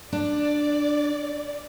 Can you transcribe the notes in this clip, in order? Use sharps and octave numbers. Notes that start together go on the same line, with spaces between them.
D4 D5